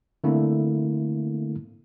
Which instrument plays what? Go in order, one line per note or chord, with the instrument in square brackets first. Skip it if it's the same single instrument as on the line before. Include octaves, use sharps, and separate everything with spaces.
[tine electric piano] D3 A3 A#3 C4 E4